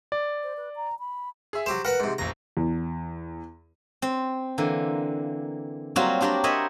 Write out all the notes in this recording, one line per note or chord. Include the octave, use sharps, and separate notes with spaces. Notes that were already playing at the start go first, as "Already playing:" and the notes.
D5
C5
B4
A#5
B5
G#4 E5
F#3 G4 C5 E7
A#4 B4 F#5 B5
G#2 C3
F1 A#1 A#5
E2
C4
D3 E3 A#3
F#3 G3 A#3 C4 F4 F#4
D4 F#4 G4 A#4 D5
A#4 C5 C#5 D#5 E5 B5